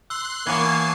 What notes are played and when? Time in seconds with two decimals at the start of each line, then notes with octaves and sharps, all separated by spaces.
0.10 C6 E6 F#6
0.46 E3 A#3 B3 C#5 G#5 A5 G#6 C7